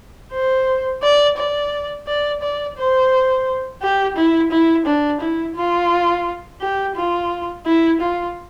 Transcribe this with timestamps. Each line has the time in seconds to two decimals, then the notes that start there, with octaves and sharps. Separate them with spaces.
0.33 C5
1.03 D5
1.37 D5
2.07 D5
2.42 D5
2.78 C5
3.82 G4
4.17 E4
4.51 E4
4.86 D4
5.21 E4
5.56 F4
6.61 G4
6.96 F4
7.66 E4
8.00 F4